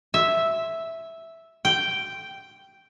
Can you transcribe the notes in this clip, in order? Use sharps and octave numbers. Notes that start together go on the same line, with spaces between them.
E5
G5